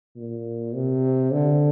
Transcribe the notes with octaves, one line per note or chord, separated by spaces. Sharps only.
A#2
C3
D3